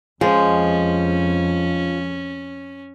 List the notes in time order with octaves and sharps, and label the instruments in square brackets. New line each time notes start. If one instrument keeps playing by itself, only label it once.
[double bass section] F2 [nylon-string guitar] F3 [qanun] G#3 [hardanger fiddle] C#4